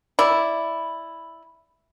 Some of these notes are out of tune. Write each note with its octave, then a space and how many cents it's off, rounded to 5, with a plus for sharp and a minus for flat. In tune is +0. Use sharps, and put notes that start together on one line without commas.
E4 +0 D5 +0 B5 +0